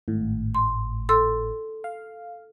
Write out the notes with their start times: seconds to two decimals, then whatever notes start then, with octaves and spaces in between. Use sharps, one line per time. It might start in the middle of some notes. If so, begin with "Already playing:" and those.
0.08 G#1 A2
0.55 C6
1.09 A4 C6 E6
1.84 F5